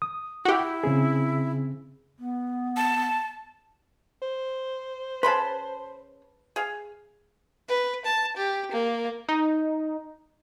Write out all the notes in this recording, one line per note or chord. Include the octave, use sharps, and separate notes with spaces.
D#6
E4 F#4 G4
C#3 C4 G#4
B3
A5
C5
C#3 B4 A5 B5 C6
G#4 F5
B4
A5
G4
A#3
D#4